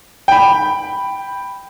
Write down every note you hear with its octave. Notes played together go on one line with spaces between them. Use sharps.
G5 B5